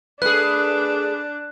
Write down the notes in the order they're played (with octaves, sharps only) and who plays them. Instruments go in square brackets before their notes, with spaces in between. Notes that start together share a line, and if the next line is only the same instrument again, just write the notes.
[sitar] A3 G#4 [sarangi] D4 [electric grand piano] B4 [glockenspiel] F#6